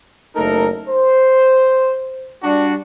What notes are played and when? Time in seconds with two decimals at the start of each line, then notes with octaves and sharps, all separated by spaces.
0.36 F#1 A3 D#4 A4 A#4
0.88 C5
2.43 G3 D4 F#4